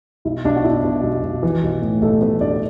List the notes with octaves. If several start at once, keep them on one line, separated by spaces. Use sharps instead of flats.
B1 E4
B1 D4
F#4
B2 E4
B2
B1
B1
E3
B1
A2
B1 A3 A4
E3 B3 B4
B1 D4 D5
D5